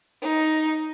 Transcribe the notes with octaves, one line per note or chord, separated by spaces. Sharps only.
D#4